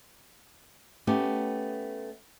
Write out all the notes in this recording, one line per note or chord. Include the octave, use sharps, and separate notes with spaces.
A3 B3 C#4 G4